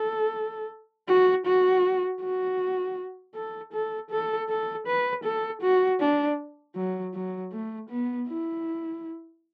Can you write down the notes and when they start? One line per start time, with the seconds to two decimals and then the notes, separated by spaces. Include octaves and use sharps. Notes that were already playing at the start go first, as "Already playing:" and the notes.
Already playing: A4
1.08 F#4
1.46 F#4
2.21 F#4
3.35 A4
3.73 A4
4.10 A4
4.49 A4
4.87 B4
5.24 A4
5.62 F#4
6.00 D4
6.76 F#3
7.14 F#3
7.52 A3
7.90 B3
8.28 E4